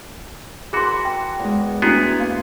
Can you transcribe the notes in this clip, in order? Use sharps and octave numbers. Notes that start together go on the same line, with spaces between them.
E3 F#4 G#4 A#4 B5 C6
G5
E2 G#3
A2 B3 D4 E4 F#4 G#4
A#3 F5 C6